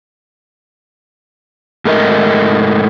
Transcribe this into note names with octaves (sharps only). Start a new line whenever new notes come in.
G#2 A3 A#4 D#5